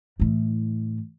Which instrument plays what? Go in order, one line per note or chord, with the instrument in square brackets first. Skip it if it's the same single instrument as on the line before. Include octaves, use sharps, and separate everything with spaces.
[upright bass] A2 E3